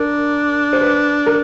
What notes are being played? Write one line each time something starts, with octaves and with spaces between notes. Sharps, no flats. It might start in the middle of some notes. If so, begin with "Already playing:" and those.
Already playing: D4 A#4
C5
B4
A#4